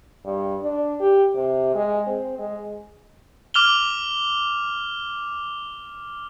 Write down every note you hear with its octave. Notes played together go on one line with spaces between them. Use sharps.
G2
D4
G4
C3
G#3
C4
G#3
D6 F6 F7 G7